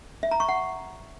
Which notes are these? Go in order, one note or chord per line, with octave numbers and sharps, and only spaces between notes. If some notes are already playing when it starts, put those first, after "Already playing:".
E5
A#5
C#6
F#5